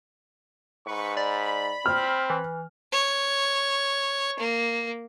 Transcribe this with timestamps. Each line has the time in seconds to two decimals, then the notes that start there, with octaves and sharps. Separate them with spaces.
0.87 G#2 B4 C#6
1.17 D5 B5
1.86 C4 F6
2.30 E3
2.92 C#5
4.39 A#3